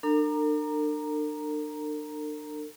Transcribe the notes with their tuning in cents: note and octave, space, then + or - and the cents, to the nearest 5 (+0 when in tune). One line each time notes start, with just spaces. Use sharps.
D4 +35 A#4 -45 A#5 +0